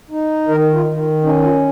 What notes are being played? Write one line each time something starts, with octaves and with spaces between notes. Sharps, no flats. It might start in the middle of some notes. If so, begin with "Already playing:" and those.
D#4
D#3 A#4
F4
D#3
C#4 D#4
F4